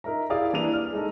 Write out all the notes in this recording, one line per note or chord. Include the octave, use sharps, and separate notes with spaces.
D#4 A#4 E5 A#5
E4 G4 G#4 D5 F5 D#6
E3 A#3 D4 E4 D#7 F7
F6
G#3 D#4 A4